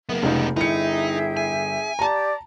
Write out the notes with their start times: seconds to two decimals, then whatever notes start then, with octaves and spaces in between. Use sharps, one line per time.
0.09 F#1 A#3 B3
0.23 F1 C#2 D#4 G4
0.56 G1 D#4 E4 G#4 E5 G5 C#7
1.37 G#5
1.99 G4 D5 A5 A#5